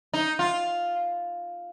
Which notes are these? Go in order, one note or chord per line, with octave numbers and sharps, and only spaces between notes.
D#4
F4